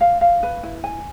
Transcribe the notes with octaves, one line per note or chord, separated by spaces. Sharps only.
F5
F5
B4
E4
G#5